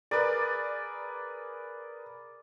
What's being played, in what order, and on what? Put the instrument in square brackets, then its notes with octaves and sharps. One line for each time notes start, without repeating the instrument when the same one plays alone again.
[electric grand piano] G#4 A#4 B4 [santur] D5